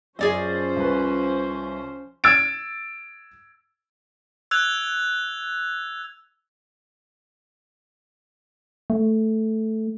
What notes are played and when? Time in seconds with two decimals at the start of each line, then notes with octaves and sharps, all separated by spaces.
0.19 F#2 F3 C#4 G#4 C5 D5 D#5
0.76 C2 B4
2.24 E6 G#6 A6 D7
4.51 E6 F#6 G#6 F7
8.90 A3